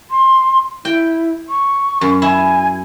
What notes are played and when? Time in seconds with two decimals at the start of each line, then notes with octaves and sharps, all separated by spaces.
0.11 C6
0.85 E4 G5
1.49 C#6
2.01 F#2
2.22 E4 G#5